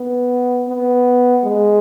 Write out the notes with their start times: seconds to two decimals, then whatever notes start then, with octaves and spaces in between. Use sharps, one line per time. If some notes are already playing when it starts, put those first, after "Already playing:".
Already playing: B3
0.68 B3
1.44 G#3